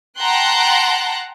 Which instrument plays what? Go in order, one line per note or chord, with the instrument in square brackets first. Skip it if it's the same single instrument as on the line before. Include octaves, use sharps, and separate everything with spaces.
[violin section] F#5 G5 A5 A#5 C6 F#6